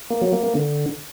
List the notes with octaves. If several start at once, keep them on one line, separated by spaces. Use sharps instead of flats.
A#3
F#3
A#3
A#3
D3